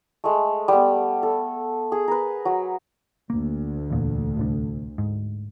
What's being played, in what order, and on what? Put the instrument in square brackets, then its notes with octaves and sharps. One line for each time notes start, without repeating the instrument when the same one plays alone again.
[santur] G#3 A3
G3 B3
A4
G#4
A#4 B4
F#3
[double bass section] D2 [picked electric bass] A#3
[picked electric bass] E2 A#2
D1 C2 D3
G#2